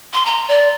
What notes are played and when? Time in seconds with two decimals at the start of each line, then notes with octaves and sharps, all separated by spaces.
0.14 C6
0.26 A#5
0.48 D5